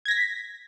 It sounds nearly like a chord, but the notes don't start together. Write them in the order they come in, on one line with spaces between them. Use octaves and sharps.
G#6 A#6 B6